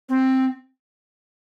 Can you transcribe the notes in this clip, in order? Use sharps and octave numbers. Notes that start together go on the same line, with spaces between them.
C4